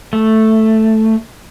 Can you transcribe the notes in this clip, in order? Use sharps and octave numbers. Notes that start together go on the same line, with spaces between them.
A3